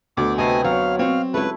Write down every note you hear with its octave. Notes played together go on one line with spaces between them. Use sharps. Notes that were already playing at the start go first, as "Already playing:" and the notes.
D2 B2 D6
C3 A3 B3 D#5 F5 G#5
B2 F#3 F5
C4 C#5 F5
C#2 A3 E4 B4